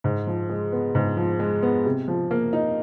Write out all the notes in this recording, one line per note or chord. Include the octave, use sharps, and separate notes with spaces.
G#2
F3
G#3
B3
G#2
F3
G#3
B3
C3
F3
A#3
D#4